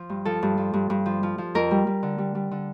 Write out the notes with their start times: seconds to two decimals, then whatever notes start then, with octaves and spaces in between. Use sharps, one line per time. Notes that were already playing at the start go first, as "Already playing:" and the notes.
Already playing: F3
0.09 G2
0.25 F3 A4
0.43 G2
0.58 F3
0.73 G2
0.90 G2
1.06 F3
1.23 F3
1.38 F3
1.55 F2 A#4
1.71 G3
1.87 G3
2.03 D3
2.18 G3
2.35 G3
2.51 D3